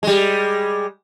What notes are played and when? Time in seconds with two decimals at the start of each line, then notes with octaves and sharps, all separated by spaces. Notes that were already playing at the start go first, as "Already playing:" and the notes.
0.03 G3 G#3